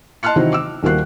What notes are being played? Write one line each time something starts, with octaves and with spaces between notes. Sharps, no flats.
D#5 A5 C6 F6 F#6 C#7
C3 D#3 E3 F#3 C4 D#4
D6 E6
D#1 D#3 A#3 F#4 F#6 C7